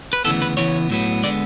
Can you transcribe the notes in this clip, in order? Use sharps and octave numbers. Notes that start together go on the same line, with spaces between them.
B4
D2 C#3 E3 B3 A4
B4
C#3 E3 B3 C#5
A2 F#3 B3
D3 G#3 B3 D5